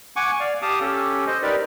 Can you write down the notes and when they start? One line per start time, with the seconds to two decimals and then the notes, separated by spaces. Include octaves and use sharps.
0.16 F#5 G#5 C#6 D6
0.40 D5 F5
0.62 G4 F5 A5 D6 D#6
0.80 C#4 G4 A4
1.27 C5 D#5
1.43 D#4 G4 A#4 B4 D5